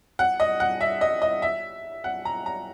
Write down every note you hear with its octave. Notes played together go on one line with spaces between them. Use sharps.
F#5
D#5
F#5
E5
D#5
D#5
E5
F#5
A#5
A#5